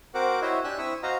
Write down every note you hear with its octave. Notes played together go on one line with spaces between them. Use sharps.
C4 F#4 A#4 C5 F#5 D6
E4 F#4 C5 C#5 D#5 E5
D4 G4 G#5 E6 F#6
C4 E4 B5 C#6 D#6 E6
F#4 C5 D#5 F5 A#5